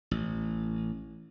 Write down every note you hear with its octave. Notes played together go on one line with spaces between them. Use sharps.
A1